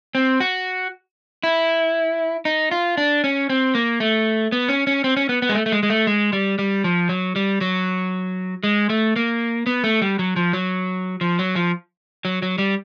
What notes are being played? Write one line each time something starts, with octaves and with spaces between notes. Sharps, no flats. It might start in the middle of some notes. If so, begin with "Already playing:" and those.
C4
F#4
E4
D#4
F4
D4
C#4
C4
A#3
A3
B3
C#4
C#4
C4
C#4
B3
B3
G#3
A3
A3
G#3
G#3
A3
G#3
G3
G3
F3
F#3
G3
F#3
G#3
A3
A#3
B3
A3
G3
F#3
F3
F#3
F3
F#3
F3
F#3
F#3
G3